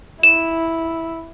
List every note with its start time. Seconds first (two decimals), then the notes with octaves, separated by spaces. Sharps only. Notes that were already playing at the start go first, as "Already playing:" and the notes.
0.23 E4 E7